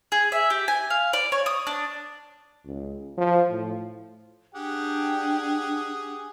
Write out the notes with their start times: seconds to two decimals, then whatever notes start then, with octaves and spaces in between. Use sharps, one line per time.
0.12 G#4
0.32 E5
0.50 G4
0.68 G#5
0.90 F5
1.13 D5
1.32 C#5
1.46 D#6
1.67 D4
2.65 C#2
3.18 F3
3.50 A2
4.55 D4 G4 G#4 F#5 G5